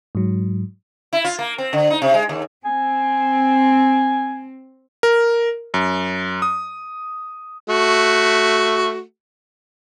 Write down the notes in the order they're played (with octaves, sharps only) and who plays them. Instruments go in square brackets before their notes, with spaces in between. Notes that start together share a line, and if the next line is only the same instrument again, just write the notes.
[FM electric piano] G#2 F#3
[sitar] E4
F4
A#3
C4
D3
D#4
C3
G#3
D#2
[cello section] C4 [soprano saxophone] G#5
[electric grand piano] A#4
F#2
D#6
[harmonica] A3 F#4